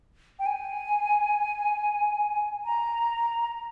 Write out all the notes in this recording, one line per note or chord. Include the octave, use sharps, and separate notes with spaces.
G5
G#5
A#5